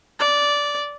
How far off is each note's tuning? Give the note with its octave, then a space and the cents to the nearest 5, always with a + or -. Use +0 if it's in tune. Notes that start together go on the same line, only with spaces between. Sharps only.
D5 -15